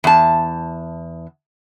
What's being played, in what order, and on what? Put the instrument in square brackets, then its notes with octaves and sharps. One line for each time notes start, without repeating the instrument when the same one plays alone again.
[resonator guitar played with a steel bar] E2 A5